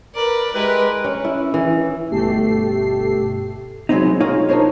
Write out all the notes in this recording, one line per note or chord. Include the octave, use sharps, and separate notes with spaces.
A#4 B4 D5
G#3 E4 G4 A#4 B4
C#4
E4
E3
G1 B2 A3 G4 A4 C7
F#3 G#3 A3 B3 C4 D#4
D#4 F4 G#4 C#5 D#5 F5
D4 D#4 F4 A#4 C5 C#5